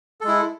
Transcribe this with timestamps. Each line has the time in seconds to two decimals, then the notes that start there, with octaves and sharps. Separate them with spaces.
0.21 A4
0.24 G#3
0.28 E4